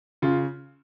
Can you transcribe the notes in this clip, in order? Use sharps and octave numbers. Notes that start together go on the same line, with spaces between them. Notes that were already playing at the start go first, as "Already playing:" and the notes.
C#3 F4